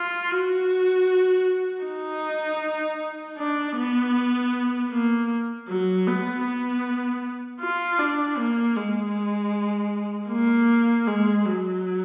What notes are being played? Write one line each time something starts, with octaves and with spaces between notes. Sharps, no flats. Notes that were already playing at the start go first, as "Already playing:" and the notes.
Already playing: F4
F#4
D#4
D4
B3
A#3
F#3
B3
B3
F4
D4
A#3
G#3
A#3
G#3
F#3